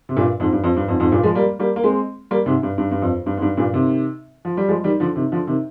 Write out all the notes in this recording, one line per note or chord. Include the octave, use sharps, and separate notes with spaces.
C3
G2 A#2
F2 G#2
G2
F2
G2
F2 G#2
F2 G#2
G2 A#2
F3 G#3
G3 A#3
G3 A#3
A#3
G#3 C4
G3 A#3
G#2 C3
G2
G2
G2
F2
G2
G#2
G2
G2 A#2
C3 D#3
F3
G3
F3 G#3
D#3 G3
D3 F3
C3 D#3
D3 F3
C3 D#3